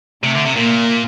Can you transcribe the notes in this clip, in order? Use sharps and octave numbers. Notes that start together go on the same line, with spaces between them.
C3 A3
D3
C3
A#2 A#3